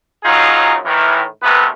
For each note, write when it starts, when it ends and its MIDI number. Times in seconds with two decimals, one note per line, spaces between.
0.24 0.76 32
0.24 0.76 42
0.24 0.76 54
0.24 0.76 63
0.24 0.76 65
0.24 0.76 68
0.85 1.23 45
0.85 1.23 51
0.85 1.23 52
1.42 1.69 34
1.42 1.69 48
1.42 1.69 51
1.42 1.69 57
1.42 1.69 59
1.42 1.69 71